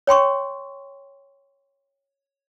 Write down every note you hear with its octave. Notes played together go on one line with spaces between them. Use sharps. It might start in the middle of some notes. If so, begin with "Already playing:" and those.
C#5 G5 C6 C#6